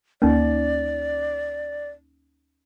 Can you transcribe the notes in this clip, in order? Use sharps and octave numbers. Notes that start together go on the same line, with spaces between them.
D2 A#3 C#4 D#4 D5